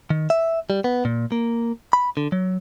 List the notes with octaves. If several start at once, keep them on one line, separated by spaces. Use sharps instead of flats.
D#3
E5
G3
B3
A#2
A#3
B5
D3
F#3